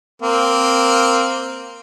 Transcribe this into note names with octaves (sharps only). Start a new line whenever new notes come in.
A#3 C4